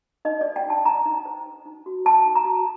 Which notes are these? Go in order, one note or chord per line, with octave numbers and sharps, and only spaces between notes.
D#4 D#5
D5
C5
G5
D#4 A5
D#4 A#5
D#4
C5
C5
D#4
F#4
C5 A5
D#4
A#5
F#4